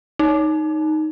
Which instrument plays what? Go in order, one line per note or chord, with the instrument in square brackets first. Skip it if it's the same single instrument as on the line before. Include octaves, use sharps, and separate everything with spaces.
[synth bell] D#4